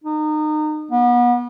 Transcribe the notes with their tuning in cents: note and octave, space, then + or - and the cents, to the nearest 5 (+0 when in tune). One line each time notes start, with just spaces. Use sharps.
D#4 -30
B3 -30